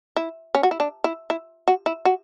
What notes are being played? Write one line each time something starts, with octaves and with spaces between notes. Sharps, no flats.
E4
C#4
F#4
E4
D4
E4
E4
F#4
E4
F#4